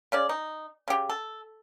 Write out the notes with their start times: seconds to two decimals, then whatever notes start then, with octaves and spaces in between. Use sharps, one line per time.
0.12 C#3 C#4 D5
0.29 D#4
0.88 C#3 G4
1.10 A4